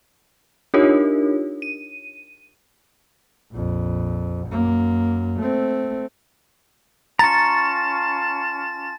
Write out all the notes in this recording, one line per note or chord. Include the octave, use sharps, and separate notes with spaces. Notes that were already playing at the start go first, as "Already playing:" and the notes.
D4 D#4 F4 G4 A#4 C#5
D#7
A#1 F2
F#2 A#3
A3 C4
C#4 F4 A5 A#5 C#6 A6